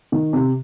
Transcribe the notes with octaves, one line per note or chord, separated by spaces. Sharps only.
D#3
C3